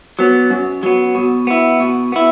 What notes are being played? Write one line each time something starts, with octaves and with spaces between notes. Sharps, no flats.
F#3 B3
F#2
F#3 B3
B2
B3 E4
B2
B3 E4